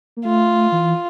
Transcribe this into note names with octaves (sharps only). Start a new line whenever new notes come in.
A#3
A3 F4
E3